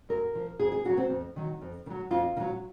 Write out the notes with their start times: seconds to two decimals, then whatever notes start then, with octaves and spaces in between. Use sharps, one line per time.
0.09 F#2 A#4
0.35 F3
0.59 F2 G#4
0.72 G#4
0.85 D#3 F#4
0.89 F#3
0.97 C4
1.10 F2
1.36 D#3 F#3
1.61 F2
1.86 D#3
1.90 F#3
2.11 F2 F4
2.37 D#3
2.40 F#3